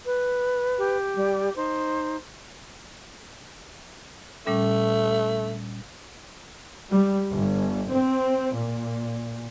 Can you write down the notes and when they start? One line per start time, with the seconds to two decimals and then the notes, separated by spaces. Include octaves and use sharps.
0.06 B4
0.78 G4
1.16 G3
1.56 D#4 C5
4.46 A#2 G3 A3 C#4
6.90 G3
7.32 G1
7.91 C4
8.54 A#2